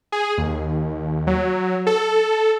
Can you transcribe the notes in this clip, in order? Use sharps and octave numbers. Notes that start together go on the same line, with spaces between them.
G#4
D#2
F#3
A4